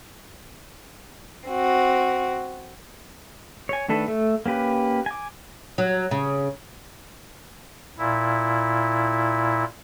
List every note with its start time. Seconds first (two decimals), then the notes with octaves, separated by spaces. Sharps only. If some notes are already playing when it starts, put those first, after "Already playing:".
1.47 C4 F#4
3.69 C#5 G#5
3.88 D#3 A3 D4 A4 B4
4.08 A3
4.46 A#3 C#4 G4 B4
5.06 G#5 D6
5.78 F#3
6.11 C#3
7.98 A#2 E4